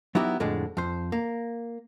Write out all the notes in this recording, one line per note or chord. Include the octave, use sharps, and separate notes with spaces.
F#3 B3 D#4 E4 F#4 G4
F2 A2 D3 G#3
F2 C5
A#3